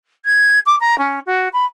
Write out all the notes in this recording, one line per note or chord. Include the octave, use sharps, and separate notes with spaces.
G#6
D6
A#5
C#4
F#4
B5